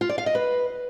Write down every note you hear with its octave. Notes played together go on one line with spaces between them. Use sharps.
F4
D5
F5
D#5
B4